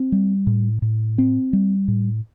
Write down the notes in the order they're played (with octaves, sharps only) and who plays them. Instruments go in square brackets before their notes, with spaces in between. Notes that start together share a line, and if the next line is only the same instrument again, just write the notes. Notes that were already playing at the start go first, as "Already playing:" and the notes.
Already playing: [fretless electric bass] C4
G3
A2
A2
C4
G3
A2